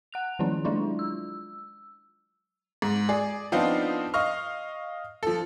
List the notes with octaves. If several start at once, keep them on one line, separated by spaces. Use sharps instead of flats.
F#5 F#6 F7
D#3 F3 F#3 C#4 E4
F#3 G#3 D4 E4 F4
E6
G#2
G#4 D5
F3 B3 C4 D4 D#4 F5
D#5 F5 C#6 F6
F3 A4